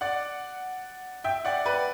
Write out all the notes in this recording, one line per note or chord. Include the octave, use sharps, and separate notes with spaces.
D5 F#5
E5 G5
D5 F#5
B4 D5